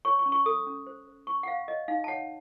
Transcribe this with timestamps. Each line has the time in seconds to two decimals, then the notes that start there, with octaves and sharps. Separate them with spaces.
0.05 C#5 C#6
0.19 C#6
0.26 C#4
0.32 C#6
0.46 A4 D#6
0.67 C#4
0.87 C5
1.07 C5
1.27 C5 C#6
1.43 F#5
1.47 C5 F5
1.68 C#5 D#5
1.88 D#4 F5
2.04 A5
2.08 C#5 F#5